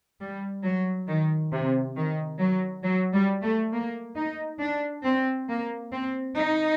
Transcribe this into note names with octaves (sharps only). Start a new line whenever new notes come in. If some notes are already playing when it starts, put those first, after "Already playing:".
G3
F#3
D#3
C3
D#3
F#3
F#3
G3
A3
A#3
D#4
D4
C4
A#3
C4
D#4